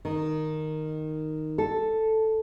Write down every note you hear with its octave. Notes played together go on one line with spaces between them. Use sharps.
D#3
A4